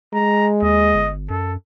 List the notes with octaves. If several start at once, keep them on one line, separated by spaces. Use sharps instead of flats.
G#3 A#5
D#2 D#5
G1
F#2 A4